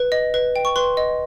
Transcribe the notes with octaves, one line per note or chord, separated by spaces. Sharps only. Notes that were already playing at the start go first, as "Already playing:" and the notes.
Already playing: B4
D#5
B4
G5
C#6
B4 C6
D#5